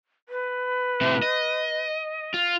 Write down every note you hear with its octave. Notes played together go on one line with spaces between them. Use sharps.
B4
A2 C3
D#5
F4